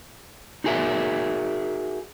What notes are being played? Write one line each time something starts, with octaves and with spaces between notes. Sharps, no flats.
D#4 F#4 G#4 A#4 E5